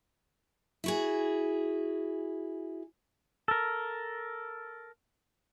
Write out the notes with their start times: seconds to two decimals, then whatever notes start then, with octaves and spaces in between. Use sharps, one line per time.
0.84 E4 F#4 G#4
3.48 A4 A#4